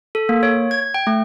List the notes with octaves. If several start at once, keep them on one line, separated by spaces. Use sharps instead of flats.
A4
A#3
C#5
G#6
G5
A3